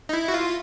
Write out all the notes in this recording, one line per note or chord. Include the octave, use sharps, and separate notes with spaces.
D#4
E4
F#4
F4